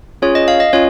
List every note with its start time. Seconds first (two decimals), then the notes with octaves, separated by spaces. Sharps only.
0.22 C#4 F4 G#4 C#5
0.35 D#5
0.48 F5
0.60 D#5
0.73 C#4 F4 C#5